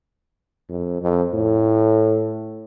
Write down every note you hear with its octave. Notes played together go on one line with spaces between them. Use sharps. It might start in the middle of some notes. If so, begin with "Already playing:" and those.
F2
F2
A2